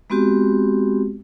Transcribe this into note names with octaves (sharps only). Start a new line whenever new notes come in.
G#3 B3 C4 F#4 G4